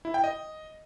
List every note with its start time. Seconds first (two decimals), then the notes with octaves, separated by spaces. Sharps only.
0.05 E4
0.14 G5
0.24 D#5